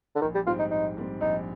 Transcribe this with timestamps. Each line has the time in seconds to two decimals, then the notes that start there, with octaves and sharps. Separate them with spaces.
0.15 D3
0.22 A#1 D#3
0.35 G3
0.47 G#2 G3 C4 F4
0.59 D#4
0.71 A#1 D#4
0.97 G#2 G3 C4
1.21 A#1 D#4